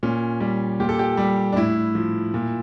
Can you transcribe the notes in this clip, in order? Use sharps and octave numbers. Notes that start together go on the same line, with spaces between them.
A#2 C#4
G3
A#2 G4
A4
G4
G3
D4
A2 E4
F3
A#2